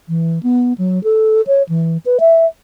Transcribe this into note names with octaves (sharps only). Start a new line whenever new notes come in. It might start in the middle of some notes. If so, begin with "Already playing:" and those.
E3
B3
F#3
A4
C#5
E3
B4
E5